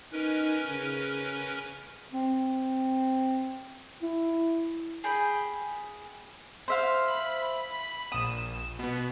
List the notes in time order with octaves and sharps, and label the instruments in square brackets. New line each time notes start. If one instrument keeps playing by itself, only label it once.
[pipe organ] C#4 A#4 B4 [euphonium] D#4
[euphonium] C#3
[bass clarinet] C4
E4
[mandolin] G#4 G5 B5
C5 E5 F5
[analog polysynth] B5
[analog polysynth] A#1 E7 [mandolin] D#6
[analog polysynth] B2 B3